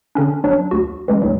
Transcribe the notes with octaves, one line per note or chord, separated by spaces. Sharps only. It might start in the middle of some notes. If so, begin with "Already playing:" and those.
D3 C#4 D4
G2 F#3 D4
D2 F#4
E3 G#3 C#4
D2 G#2 F#3